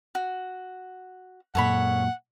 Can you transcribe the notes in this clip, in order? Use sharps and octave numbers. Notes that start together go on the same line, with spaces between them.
F#4
F#2 A#2 A4 C#5 F#5 B5